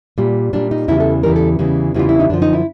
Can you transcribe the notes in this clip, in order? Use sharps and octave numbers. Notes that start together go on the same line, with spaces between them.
A#2 G3
A#2 G3 D4
D#4
E2 C#3 E3 G3 E4
A4
E2 C#3 E3 G3 A#4
A4
E2 C#3 E3 G3
E2 C#3 E3 G3 F4
E4
D#4
F#2 D3 F3 D4
D#4
E4